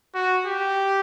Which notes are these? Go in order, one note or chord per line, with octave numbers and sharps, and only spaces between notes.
F#4
G4